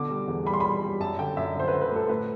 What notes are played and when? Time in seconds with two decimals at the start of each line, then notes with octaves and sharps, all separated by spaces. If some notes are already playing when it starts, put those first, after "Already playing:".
Already playing: B2 D3 D6
0.10 G3
0.28 E2
0.46 G3 B5
0.54 C6
0.60 G3 B5
0.83 G3
1.00 F#2 A5
1.19 D3 G5
1.37 F#2 E5
1.55 D3 C5
1.68 B4
1.73 D3
1.81 B4
1.92 A3 A4
2.09 A2 B4